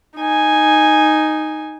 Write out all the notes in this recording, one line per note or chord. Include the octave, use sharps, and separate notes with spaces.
D#4 G#5